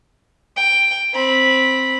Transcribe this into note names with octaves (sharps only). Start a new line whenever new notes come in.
G5
C4 B5